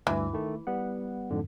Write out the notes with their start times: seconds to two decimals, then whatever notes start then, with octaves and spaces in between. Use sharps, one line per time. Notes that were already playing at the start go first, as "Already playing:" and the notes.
0.07 D2 G2 E3
0.33 D#3 A3
0.67 G3 B3 F#5
1.31 F2 G#2 D3